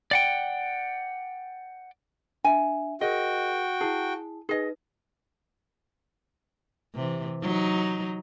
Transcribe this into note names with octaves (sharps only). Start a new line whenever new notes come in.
D5 F#5 G5
D4 E5 G#5
F#4 G#4 A#4 D#5 G5
E4 G#4 A5
D#4 G#4 B4 D#5
C3 E3
F#3 D#4